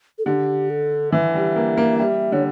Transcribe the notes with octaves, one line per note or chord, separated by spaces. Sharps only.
A4
D3 G4
A4
E3 E5
G3
A#3
A#3
G3 E5
D3 C#5